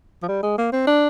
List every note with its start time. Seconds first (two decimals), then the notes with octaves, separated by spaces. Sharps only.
0.23 F3
0.28 G3
0.43 G#3
0.58 A#3
0.73 C4
0.87 D4